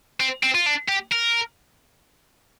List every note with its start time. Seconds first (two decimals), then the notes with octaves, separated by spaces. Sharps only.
0.20 C4
0.43 C4
0.55 F4
0.66 D4
0.89 G4
1.12 A#4